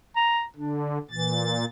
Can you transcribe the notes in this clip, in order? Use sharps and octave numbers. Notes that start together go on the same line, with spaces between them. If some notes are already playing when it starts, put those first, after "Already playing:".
A#5
D3 D4
A#2 E3 A6